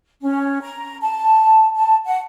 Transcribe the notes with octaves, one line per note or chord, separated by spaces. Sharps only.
C#4
A#5
A5
A5
F#5